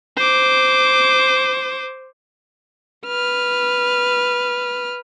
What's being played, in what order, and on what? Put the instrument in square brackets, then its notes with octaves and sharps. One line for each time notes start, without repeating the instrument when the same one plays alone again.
[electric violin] C5 D6
B4 F6